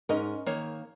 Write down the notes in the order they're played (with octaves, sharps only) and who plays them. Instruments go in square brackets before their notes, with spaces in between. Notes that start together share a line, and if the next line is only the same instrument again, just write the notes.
[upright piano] G#2 [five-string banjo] C#4 A#4 D#5
[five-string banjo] D#3 A#3 C#5